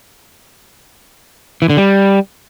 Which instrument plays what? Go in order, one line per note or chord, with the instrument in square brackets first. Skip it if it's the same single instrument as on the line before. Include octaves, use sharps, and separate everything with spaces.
[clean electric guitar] E3
D3
G3